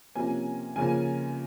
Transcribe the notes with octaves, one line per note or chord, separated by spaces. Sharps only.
C3 F3 A#3 C#4 G#5
C#3 F3 A#3 C#4 G#5